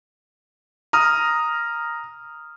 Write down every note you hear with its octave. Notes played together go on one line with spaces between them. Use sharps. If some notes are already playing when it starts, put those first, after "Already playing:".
A#5 D#6 F6